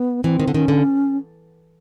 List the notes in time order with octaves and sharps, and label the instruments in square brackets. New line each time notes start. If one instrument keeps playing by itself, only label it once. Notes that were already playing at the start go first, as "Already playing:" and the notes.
Already playing: [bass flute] B3
[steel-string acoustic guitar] E3 [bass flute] C4
[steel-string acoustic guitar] D#3
D3
[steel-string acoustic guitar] D#3 [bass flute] C#4
[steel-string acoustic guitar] D3